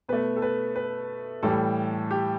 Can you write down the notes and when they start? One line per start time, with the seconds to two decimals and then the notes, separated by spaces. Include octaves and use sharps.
0.09 B2 A3 B4
0.36 A4
0.42 B4
0.76 B4
1.43 A2 E3 G3 A4
2.11 G4